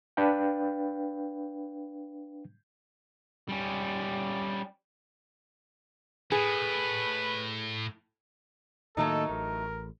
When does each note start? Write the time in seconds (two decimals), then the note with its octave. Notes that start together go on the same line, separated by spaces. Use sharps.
0.17 D4 B4 F5 G5
3.49 G3 C#4
6.32 A2 G#4 B4
8.97 A2 D#3 F#3 A3 A#3 D#4 A4
9.30 A1 A#4